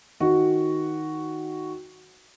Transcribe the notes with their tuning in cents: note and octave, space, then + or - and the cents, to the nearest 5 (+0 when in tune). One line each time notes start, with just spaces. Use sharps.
D#3 +5 F#4 +0